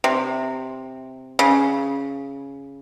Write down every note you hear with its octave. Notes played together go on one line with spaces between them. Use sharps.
C3
C#3